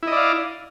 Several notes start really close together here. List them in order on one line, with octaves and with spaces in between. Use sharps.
E4 D#5 D5 F5